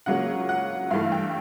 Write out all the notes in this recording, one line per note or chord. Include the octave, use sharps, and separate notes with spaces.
C#2 C#3 F#3 A#3 C#4 F#5
F#5
G2 E3 A3 F5
G5